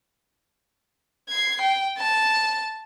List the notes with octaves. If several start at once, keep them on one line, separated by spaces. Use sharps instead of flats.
G#6 C7
G5
A5